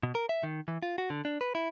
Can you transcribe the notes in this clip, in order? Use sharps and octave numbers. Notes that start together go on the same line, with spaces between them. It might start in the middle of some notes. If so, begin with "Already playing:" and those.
B2
A#4
E5
D#3
E3
F4
F#4
D3
D4
B4
E4